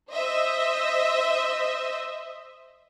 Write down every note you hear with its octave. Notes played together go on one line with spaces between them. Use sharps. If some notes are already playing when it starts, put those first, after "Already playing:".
C5 D#5 E5